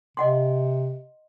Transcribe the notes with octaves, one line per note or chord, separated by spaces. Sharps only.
C3 D#5 F#5 C6